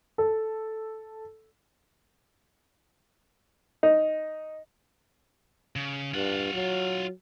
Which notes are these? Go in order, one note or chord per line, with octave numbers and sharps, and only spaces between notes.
A4
D#4
C#3
G2 F4 F#5
F#3